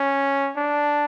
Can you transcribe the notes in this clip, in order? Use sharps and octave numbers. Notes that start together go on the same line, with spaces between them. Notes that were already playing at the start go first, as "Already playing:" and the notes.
Already playing: C#4
D4